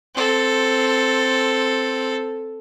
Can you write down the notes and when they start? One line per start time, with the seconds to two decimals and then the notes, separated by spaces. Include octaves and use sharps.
0.15 C4 A4